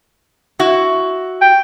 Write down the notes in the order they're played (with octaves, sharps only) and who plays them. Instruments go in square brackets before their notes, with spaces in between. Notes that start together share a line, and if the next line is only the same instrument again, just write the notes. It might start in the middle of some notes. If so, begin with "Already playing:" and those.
[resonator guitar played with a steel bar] E4 F#4
[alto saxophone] G5